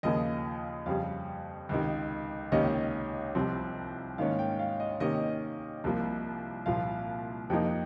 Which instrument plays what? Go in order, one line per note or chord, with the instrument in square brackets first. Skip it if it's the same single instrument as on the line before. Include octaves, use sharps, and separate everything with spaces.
[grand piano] D#2 C#3 F3 A#3 D#5
F2 C#3 G3 F5
C#2 C3 D#3
C#2 C3 D#3 A#3 C#4 D#5
C2 C3 F3 C4
G#2 D#3 A#3 C#4 F5
G5
F5
D#5
C3 D#3 A#3 C#4 D#5
C2 C3 F3 A#3
C2 A#2 F3 F5
F2 C3 F3 A#3 D#4 G5